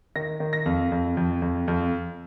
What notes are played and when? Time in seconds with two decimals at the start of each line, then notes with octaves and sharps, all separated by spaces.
0.16 D#3 A#6
0.40 D#3
0.53 A#6
0.66 F2
0.92 F2
1.17 F2
1.42 F2
1.68 F2